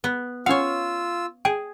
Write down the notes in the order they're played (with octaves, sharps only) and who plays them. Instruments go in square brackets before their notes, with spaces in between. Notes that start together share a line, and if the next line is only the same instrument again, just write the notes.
[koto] B3
[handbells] C#4 F#5 [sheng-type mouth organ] F4 E6 [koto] C#5 F5
[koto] G#4 [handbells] G5